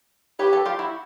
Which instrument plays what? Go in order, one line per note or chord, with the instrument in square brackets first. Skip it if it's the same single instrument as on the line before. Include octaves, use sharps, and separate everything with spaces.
[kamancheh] G4 [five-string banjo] B4 C#5
[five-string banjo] A4 B4
F4 G4
E4 F#4